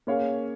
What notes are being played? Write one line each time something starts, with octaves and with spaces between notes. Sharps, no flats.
A#3 C#4 G#4 C#5 F5